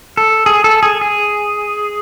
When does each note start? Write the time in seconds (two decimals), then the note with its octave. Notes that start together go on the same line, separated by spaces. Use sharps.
0.17 A4
0.46 G#4
0.64 A4
0.83 G#4
1.01 G#4